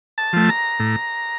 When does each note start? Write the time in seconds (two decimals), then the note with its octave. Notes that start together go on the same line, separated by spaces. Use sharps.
0.18 A5
0.33 F3 A3
0.49 A#5
0.80 A2